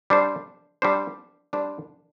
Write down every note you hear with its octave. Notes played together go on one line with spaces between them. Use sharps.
G3 D4 C5
G3 D4 C5
G3 D4 C5